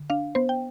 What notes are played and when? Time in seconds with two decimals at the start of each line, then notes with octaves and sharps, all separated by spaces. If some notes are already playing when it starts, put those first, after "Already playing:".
Already playing: D3
0.10 D4 F5
0.35 B3 C5
0.49 G5